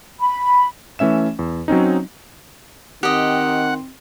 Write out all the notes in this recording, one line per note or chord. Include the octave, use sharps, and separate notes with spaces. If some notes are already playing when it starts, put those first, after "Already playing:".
B5
E3 A3 C#4 E5 E7
E2
F#3 C4 C#4 D#4
D#3 C4 G4 D#5 F#5